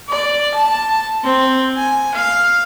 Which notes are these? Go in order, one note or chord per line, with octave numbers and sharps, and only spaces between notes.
D5
A5
C4
G#5
F5